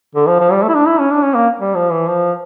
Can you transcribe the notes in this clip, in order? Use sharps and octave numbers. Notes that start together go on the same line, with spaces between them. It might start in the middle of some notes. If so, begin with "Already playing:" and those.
D3
F3
F3
G3
A3
E4
D4
E4
C#4
D4
C#4
A#3
G3
F3
E3
F3